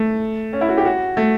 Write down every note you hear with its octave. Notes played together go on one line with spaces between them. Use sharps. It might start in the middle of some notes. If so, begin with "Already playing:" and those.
Already playing: A3
C#4
E4
F#4
G4
F#4
A3